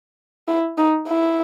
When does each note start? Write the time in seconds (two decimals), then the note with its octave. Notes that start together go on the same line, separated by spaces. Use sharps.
0.48 E4
0.77 D#4
1.07 E4